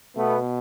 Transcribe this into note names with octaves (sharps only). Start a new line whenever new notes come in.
B2 A3 B3